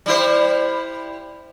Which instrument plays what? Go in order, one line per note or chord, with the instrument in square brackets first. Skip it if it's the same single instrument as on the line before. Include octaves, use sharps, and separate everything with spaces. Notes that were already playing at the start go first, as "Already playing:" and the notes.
[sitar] G3 E4 C5